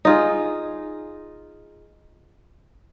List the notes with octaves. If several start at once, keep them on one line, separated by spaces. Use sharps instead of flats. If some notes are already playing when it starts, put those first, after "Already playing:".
D#4 F4 G#4